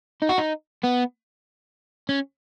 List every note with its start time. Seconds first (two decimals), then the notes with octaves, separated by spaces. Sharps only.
0.22 D#4
0.29 F#4
0.38 D#4
0.84 B3
2.09 C#4